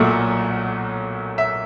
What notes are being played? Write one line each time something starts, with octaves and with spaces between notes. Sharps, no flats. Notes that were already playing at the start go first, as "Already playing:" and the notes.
Already playing: B1 A#2 F#3 A3
E5